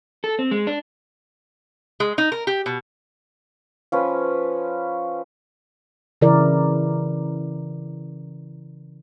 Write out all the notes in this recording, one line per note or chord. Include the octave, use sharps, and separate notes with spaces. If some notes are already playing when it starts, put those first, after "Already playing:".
A4
C4
G#3
D4
G#3
D#4
A#4
G4
B2
F3 C#4 B4
C#3 E3 E4 A#4 D5